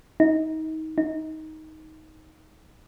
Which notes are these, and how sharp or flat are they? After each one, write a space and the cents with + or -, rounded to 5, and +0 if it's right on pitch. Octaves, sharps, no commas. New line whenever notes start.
D#4 +25
D#4 +10